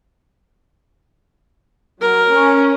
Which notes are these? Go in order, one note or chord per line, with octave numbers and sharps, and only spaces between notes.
F#3 A#4
C#4